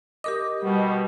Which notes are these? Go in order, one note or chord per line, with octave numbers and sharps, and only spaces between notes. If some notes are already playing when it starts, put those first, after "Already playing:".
G4 A#4 D#5 D6
B2 G3